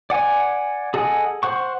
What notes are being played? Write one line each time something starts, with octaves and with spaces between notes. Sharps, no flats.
D5 F#5 G#5
G#4 A4 D#5 F#5 G#5
C5 F#5 C#6